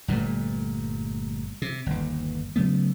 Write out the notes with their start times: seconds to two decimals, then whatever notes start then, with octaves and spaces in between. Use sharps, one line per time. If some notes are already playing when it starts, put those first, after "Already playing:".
0.08 G1 A#2 G3 A3
1.62 C3
1.86 G1 D#2
2.56 C#3 F#3 A3 B3